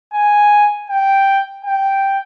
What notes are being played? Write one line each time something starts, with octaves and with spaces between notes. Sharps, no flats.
G#5
G5
G5